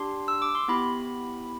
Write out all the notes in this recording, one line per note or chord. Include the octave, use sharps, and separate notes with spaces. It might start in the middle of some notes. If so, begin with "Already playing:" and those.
Already playing: D4 G4 C6
E6
D6
C6
B3 E4 G4 B5